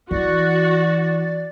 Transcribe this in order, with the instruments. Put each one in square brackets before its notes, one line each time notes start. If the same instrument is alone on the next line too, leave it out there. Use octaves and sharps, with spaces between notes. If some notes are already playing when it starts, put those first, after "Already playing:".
[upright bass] E3 [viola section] F#4 [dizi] D5